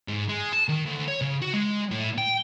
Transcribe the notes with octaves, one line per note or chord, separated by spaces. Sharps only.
G#2
G#3
A5
D#3
D2
C#5
C#3
F#4
G#3
A2
G5